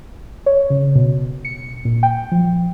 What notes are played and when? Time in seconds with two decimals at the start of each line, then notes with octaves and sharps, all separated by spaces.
0.46 C#5
0.70 C#3
0.95 B2
1.45 C#7
1.85 A#2
2.03 G5
2.32 F3